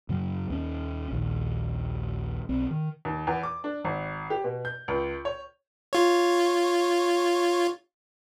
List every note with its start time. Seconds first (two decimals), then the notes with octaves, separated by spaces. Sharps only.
0.09 F#2 C#3 F#3
0.50 D#2 C#4
1.11 A#1 D#2
2.49 B1 C4
2.71 D#3
3.05 D#2
3.27 E2
3.43 D6
3.64 D4
3.84 G#1
4.30 G4
4.44 B2
4.65 G6
4.88 C#2
5.25 C#5
5.93 F4 C#5